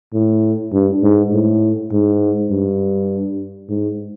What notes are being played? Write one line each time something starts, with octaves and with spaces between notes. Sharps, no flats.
A2
G2
G#2
A2
G#2
G2
G#2